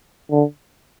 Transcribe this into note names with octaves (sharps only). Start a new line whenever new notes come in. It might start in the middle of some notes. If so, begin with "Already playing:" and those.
D3